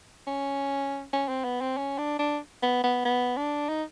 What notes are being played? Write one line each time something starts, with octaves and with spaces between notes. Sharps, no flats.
C#4
C#4
C4
B3
C4
C#4
D4
D4
B3
B3
B3
D4
D#4